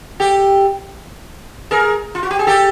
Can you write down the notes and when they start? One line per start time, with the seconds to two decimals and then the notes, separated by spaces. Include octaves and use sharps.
0.20 G4 A4
1.71 G#4 A#4
2.15 F4
2.23 F#4
2.31 G4
2.39 G#4
2.47 G4 A4